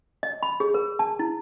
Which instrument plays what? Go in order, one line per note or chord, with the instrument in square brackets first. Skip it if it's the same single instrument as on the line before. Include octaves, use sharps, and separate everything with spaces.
[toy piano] D#5
B5
G#4
A#4
A5
E4